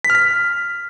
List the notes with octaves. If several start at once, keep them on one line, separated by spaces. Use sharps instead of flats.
B6
F6
B6